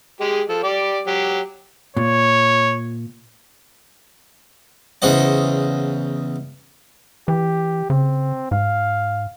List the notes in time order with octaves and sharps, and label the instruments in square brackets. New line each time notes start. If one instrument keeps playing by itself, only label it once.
[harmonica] G#3 G4 G#4
F3 A4
G4 D5 D6
F#3 G4
[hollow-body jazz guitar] A#2 [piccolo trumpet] C#5
[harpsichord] E2 C#3 C5 D#5 F#5
[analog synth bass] E3 [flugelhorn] G4
[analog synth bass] C#3 [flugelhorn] C4
[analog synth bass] G#2 [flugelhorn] F5